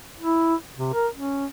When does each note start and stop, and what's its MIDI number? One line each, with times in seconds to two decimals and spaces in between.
0.20 0.55 64
0.78 0.93 48
0.93 1.08 70
1.16 1.46 61